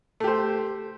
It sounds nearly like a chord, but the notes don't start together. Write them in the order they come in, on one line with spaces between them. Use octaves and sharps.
A3 G4 C5